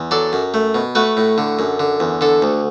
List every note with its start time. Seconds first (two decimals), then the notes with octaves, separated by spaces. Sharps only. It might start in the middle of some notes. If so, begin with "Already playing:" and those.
Already playing: E2
0.11 F#3 A4 D5
0.33 F#2
0.54 A3
0.75 B2
0.95 A3 F#4 B4
1.17 A2
1.38 D3
1.59 F#2
1.80 D3
2.00 E2
2.21 D3 A4
2.42 D2